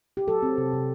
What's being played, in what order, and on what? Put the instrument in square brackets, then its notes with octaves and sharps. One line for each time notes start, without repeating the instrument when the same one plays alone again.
[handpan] G4
F#3 A4
C4
C3
C3